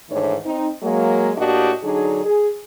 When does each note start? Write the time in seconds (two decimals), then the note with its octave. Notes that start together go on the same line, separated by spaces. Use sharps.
0.10 G#2 D#3 E3 A3 D4 C#5
0.44 C4 D#4
0.82 F#3 G#3 A#3
1.36 A2 A#3 D4 F#4 G4 D#5
1.83 D3 F#3 D4 D#4 G#4
2.26 G#4